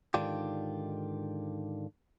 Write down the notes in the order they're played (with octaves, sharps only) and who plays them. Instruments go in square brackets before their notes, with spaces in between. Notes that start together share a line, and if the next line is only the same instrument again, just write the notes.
[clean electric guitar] G#2 D3 D#3 D4 F4 G4